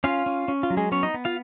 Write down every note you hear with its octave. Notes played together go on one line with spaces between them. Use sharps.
C#4 F4 F5
C#4
C#4
F4
F#3
G#3 G#4
B3 C#4 C#5
D#4 D#5
B3
F4 F5